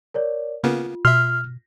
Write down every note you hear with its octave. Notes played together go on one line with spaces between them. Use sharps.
A#4 C#5 D5
C#3 A#3 B3 F4
B2 E5 C6 F6